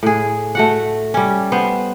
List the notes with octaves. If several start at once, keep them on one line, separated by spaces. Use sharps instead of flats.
A2 G#4
A3 F#4 F#5
G3 C#4
B3 C5